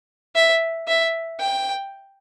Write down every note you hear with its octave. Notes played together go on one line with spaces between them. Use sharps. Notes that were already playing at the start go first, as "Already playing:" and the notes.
E5
E5
G5